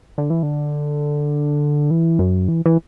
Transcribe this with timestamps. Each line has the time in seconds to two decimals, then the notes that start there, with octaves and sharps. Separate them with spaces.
0.18 D3
0.30 E3
0.43 D3
1.91 E3
2.19 F#2
2.48 E3
2.66 E3